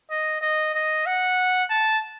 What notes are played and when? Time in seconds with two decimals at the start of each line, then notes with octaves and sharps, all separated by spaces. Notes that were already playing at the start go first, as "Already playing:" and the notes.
0.10 D#5
0.41 D#5
0.74 D#5
1.06 F#5
1.70 A5